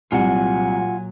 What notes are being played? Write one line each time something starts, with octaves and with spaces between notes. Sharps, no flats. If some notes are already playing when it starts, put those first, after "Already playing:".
C2 A#2 F#3 F4 F#5 G#5